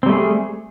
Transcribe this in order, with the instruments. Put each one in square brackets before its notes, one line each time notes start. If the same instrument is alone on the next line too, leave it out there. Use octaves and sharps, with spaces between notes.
[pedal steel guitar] C4
G3
A3
G#4